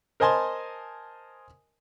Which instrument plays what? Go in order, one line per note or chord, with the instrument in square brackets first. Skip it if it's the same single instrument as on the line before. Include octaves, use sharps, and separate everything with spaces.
[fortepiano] A#4 C5 D#5 G#5 A5 C6